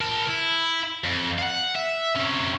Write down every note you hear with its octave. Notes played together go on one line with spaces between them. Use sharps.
A#4 A5
E4
F2
F5 F#5
E5
C3 C#4